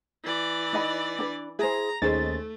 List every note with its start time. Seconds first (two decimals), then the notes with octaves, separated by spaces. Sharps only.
0.24 E3 D5
0.73 D#4 D#5 B5
1.19 D4 B4
1.59 E4 G#4 C5 A#5
2.02 D#2 A3 C#4 D#4 G#4 C5 A6